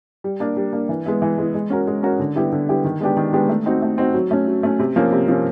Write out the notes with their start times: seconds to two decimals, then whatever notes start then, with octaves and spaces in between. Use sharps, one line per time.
0.24 G3
0.40 A#3 D4
0.57 G3
0.73 A#3 D4
0.89 E3
1.06 G#3 B3 E4
1.22 E3
1.38 G#3 B3 E4
1.54 G#3
1.70 C#4 F#4 A#4
1.87 G#3
2.03 C#4 F#4 A#4
2.20 D3
2.36 G3 B3 E4 G4
2.52 D3
2.69 G3 B3 E4 G4
2.84 D#3
3.01 G#3 B3 D4 G4
3.17 D#3
3.33 G#3 B3 D4 G4
3.49 A3
3.66 C4 D#4 F#4
3.82 A3
3.98 C4 D#4 F#4
4.14 F#3
4.31 A3 C#4
4.47 F#3
4.63 A3 C#4
4.79 C3
4.96 F3 A#3 C#4
5.12 C3
5.28 F3 A#3 C#4